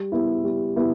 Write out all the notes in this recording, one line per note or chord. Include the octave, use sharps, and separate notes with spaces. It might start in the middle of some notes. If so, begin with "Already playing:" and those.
Already playing: G3
B3 E4
G3
B3 E4